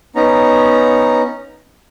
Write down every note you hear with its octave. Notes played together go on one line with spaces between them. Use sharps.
B3 C#4 D#4 A#5